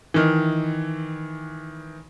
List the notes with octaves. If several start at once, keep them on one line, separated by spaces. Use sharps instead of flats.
D#3 E3